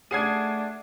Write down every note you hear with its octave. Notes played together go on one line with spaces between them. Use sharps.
A3 D4 G#4 F#5 G#6 C7 D#7